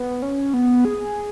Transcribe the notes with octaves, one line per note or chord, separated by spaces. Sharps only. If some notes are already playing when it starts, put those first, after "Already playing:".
Already playing: B3
C#4
B3
G#4